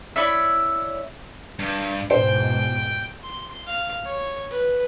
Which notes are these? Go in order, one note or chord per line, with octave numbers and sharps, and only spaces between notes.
E4 C#5 D5 E5
G2
E2 G#2 B2 C5 G5
C6
F5
C#5
B4